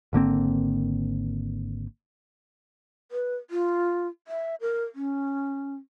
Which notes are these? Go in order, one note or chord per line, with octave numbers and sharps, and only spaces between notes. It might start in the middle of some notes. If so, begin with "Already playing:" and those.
G#1 D3 A#3 C4
B4
F4
E5
A#4
C#4